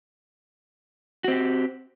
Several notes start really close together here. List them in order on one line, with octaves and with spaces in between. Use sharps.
F#4 C4 G4